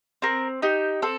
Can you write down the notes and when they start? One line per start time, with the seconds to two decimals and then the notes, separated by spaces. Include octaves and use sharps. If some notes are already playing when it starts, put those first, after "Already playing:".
0.22 C4 A#4
0.62 D#4 G4
1.02 C4 A4